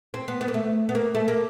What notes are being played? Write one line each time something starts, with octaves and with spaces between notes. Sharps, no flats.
C4
B3
B3
A#3
A3
B3
A#3
A3
A#3